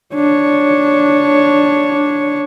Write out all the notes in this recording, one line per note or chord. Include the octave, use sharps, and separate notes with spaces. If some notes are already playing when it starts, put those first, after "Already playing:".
D4 C#5